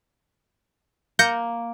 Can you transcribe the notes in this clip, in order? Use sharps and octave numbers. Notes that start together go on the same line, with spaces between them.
A#3 G6 A#6 C#7